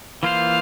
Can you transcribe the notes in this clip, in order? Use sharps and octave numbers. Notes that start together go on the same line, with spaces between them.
E3 A#3 F4 C5 F5